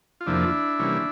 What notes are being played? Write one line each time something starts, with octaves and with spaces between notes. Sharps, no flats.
F4
F2 C3 F3 A#3 D4 E4
C3 E3 G3 A#3 C#4